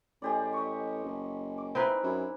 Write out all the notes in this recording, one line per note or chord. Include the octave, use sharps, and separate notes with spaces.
A1 G#3 G4 D5
D#5 C#6
F#1
D6
C4 D#4 E4 B4
F#2